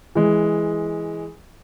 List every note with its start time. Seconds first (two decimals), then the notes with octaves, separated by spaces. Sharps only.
0.15 E3 G#3